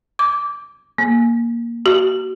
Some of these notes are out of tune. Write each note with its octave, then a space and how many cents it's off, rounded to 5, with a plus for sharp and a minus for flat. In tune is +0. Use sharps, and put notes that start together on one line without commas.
D6 -15
A#3 +5
F#4 +35